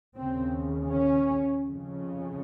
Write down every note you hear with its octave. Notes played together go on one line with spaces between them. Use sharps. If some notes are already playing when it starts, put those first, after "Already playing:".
D#2 C#3 C4
C#4
F2 C#3